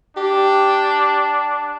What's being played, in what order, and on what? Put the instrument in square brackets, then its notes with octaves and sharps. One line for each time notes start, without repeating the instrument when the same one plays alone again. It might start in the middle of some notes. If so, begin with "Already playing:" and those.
[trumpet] D4 [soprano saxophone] G4